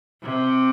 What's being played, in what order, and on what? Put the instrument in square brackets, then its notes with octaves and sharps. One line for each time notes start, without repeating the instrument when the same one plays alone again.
[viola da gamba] C3